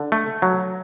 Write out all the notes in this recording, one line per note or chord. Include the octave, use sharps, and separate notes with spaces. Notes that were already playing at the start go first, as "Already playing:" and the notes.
Already playing: D3
A3
F#3